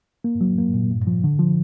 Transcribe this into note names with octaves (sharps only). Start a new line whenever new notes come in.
A#3
F#3
A#3
A#2
G2
F3
D3
F3